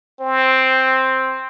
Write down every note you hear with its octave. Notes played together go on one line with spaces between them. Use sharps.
C4